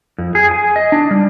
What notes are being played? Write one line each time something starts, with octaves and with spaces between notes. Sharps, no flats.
F2
G#4
G#5
D#5
D4
G3